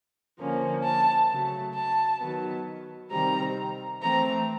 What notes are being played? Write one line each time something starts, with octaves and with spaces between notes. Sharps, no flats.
D3 F3 A#3 C#4
A5
C#3 F#3 A3
A5
D#3 F#3 B3
C3 D#3 G3 C4 A#5
E3 A3 C4 A#5